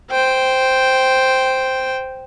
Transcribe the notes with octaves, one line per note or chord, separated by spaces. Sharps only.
C5 G5